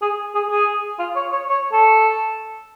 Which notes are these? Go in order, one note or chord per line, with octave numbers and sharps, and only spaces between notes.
G#4
G#4
G#4
F4
C#5
C#5
C#5
A4